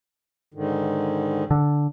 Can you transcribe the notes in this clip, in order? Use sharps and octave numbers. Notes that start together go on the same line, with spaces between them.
G#2 D3 D#3
D3